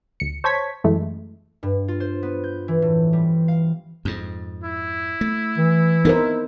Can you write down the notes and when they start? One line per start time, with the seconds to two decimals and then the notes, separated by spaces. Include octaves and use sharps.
0.20 D2 C#7
0.44 C5 C#5 A5 C#6 G#6 B6
0.84 F#2 E3 G#3 A3
1.63 G2
1.88 F4
2.00 C5
2.23 B3
2.44 G6
2.68 E3
2.82 A2
3.13 G3
3.48 F5
4.05 F2 G#2
4.64 E4
5.21 A3
5.58 E3
6.05 B3 D#4 A#4 C5